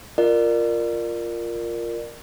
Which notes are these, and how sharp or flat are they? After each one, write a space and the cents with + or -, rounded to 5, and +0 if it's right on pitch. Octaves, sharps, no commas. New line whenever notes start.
F4 +0 A#4 +0 D5 +25